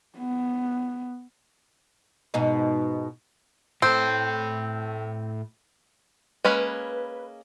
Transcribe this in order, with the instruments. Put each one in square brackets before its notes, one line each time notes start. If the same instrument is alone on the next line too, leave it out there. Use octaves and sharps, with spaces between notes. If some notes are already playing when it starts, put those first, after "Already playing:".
[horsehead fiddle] B3
[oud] G#2 B2 D#4
[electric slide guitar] A2 A4 [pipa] C4
[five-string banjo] G#3 A#3 C#4 [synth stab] B4